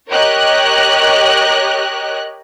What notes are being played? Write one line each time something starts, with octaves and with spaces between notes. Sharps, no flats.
G4 A#4 C#5 D#5 F#6